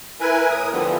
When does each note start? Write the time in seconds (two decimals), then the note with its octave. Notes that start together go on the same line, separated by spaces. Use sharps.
0.20 E4 A#4 B4 G#5
0.51 A2 A#4 D#6
0.71 D3 E3 F3 G3 B3